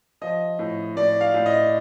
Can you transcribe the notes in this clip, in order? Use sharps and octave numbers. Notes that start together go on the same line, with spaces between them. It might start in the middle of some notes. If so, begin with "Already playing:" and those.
F3 D#5
A2
A2 D5
F5
A2
D#5